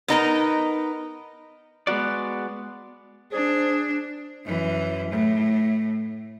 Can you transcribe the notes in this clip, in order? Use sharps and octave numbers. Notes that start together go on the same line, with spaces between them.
B3 D#4 A#4
G#3 B3 E4 F#4 D5
D4 G#4 C5
F#2 E3
A2